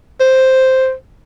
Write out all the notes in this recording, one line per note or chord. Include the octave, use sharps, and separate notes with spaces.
C5